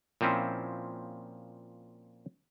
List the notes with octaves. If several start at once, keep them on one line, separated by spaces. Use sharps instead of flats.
A#2 F3 C4 C#4 E4